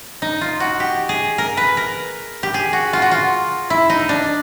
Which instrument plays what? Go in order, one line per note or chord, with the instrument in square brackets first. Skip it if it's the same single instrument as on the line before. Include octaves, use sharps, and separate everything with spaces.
[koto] D#4
F4
F#4
G4
G#4
A#4
B4
A#4
G4
G#4
F#4
F4
F#4
F4
E4
D#4
D4